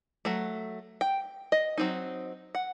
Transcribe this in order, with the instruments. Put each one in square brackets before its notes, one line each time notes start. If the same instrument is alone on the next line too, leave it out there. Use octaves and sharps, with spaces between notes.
[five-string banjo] F#3 A3
G5
D#5
F#3 C4 D#4
F#5